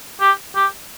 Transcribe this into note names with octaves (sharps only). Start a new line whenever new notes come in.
G4
G4